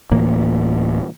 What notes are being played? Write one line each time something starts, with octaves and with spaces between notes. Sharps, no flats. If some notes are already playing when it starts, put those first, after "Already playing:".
D1 A2 E3 A#3